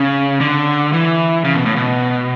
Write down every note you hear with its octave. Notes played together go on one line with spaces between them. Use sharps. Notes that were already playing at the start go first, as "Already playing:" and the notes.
Already playing: C#3
D3
E3
C#3
B2
A2
B2